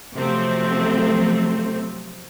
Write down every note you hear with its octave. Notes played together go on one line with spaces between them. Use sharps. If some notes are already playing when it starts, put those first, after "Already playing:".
C3 F3 F#3 A3 C4